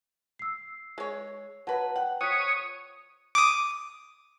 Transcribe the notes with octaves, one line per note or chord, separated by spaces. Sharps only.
E6 C7
G#3 C#5
F#3 B4 F#5 A5
F#5 G5
F3 C#5 D#6 F#6 B6
D6 D#6